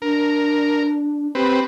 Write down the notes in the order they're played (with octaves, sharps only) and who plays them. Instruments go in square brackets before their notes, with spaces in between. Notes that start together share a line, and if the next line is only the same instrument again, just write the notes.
[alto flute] D4 [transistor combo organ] A#4
[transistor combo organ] C4 B4 [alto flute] G4